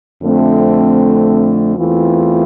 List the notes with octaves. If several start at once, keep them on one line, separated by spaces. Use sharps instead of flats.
F2 D3 A3 C4
E2 E3 A3 C4 F4